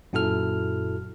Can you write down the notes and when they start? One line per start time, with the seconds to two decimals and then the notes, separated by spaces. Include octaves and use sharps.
0.13 F#2 A#2 E4 F#4 A4 F6